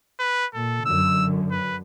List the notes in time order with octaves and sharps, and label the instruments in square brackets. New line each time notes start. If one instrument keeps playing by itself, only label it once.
[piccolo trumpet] B4
[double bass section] A#2 [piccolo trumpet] A4
[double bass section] F#2 D3 [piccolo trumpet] E6
[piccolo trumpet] B4